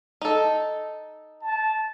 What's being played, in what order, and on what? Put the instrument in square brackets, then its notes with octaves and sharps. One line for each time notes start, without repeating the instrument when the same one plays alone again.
[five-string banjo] D#4 A4
[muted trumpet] A5